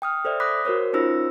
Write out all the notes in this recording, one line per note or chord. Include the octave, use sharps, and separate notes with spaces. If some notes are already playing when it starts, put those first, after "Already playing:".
G5 D#6 F6
A4 C5 D5 E5
B5 D6 D#6 F#6 A#6 B6
F#4 A#4 C5 C#5
C#4 D#4 F4 C5 E6 A#6